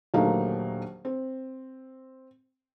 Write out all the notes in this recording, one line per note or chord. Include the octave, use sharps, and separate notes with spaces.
D#1 D3 F#3 A3 A#3 D#4
C4